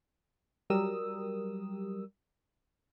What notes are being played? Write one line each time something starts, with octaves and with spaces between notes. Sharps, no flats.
F#3 G3 G4 A#4 D#6 E6